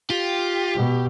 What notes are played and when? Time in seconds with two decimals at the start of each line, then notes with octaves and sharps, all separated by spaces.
0.10 F4 G4
0.75 B2